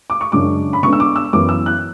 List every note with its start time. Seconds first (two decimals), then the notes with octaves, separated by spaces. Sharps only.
0.10 D6
0.21 C#6
0.32 F#2 C#3 G#3 D4 D6
0.73 B5
0.83 D3 G#3 B3 D4 C#6
0.93 E6
1.00 D6
1.16 E6
1.33 F#2 E3 B3 E4 D6
1.49 E6
1.66 F#6